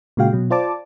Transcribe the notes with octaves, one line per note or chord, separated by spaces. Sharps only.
A#2 C#3 G#3 F#4 F5 G5
B2 F#3
F4 C5 D5 A5 D6